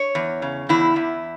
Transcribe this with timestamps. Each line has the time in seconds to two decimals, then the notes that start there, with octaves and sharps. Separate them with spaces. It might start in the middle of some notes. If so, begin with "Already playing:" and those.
Already playing: C#5
0.15 E2
0.42 C#3
0.69 E2 E4
0.96 E2